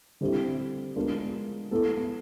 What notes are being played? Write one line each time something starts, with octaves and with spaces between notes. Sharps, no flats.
D3 G3 C4 E4 G4
G#3 B3 D4 F4 A#4
B3 E4 A4